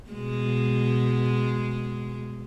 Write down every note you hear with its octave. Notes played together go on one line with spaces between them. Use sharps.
B2 G#3